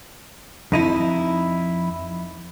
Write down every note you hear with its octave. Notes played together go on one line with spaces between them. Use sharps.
F2 D#4 E4